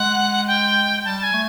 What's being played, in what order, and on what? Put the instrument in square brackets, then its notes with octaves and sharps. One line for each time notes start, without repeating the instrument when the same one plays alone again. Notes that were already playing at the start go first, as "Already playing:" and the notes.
Already playing: [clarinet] G#3 [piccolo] F#5
[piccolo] G5
[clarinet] G3 [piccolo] A5
[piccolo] G#5
[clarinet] A3